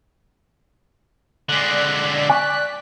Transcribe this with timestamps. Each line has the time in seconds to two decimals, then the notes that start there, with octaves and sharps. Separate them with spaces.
1.49 D3 G#3 D5 F#6 B6
2.30 G#5 C#6 F#6